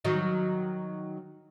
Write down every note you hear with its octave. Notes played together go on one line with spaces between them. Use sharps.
D#3 F#3 D#4